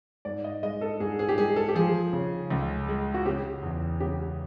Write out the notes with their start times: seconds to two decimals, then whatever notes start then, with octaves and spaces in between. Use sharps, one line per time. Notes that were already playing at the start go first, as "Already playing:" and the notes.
0.25 G#2 D5
0.44 D#5
0.63 G#3 D#5
0.81 A4
1.00 G#2 G#4
1.19 G#4
1.29 G4
1.38 G#3 G#4
1.56 A4
1.68 G4
1.75 F3 G#4
2.13 C#3
2.50 C#2
2.88 G#3
3.14 F#4
3.26 C#3 G4
3.63 E2
4.00 C#3 G4